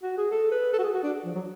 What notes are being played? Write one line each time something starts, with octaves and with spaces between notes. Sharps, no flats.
F#4
G#4
A4
B4
A4
F#4
G#4
F#4
D4
F3
F#3